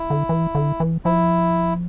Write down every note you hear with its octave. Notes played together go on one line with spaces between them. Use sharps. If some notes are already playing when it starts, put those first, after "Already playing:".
Already playing: E4
D3
E3
D3
E3
F3 E4